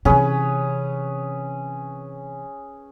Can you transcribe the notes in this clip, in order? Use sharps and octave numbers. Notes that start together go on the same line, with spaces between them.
C3 E3 C#4 G#4 B4